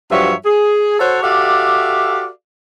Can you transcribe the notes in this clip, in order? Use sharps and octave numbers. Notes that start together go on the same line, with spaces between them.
G2 F3 F#3 C#5 E5
G#4
F#4 A4 C5 C#5
F#4 G4 A4 D5 E5 F5